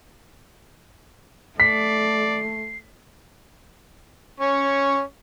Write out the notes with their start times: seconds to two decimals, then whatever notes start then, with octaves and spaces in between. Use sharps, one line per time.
1.60 A3 D5 B6 C7
4.40 C#4 C#6